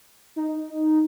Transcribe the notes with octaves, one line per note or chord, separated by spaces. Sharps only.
D#4